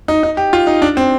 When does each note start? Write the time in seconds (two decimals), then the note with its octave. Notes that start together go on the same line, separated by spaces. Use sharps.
0.08 D#4
0.23 D#4
0.37 G4
0.53 F4
0.67 D#4
0.82 D4
0.97 C4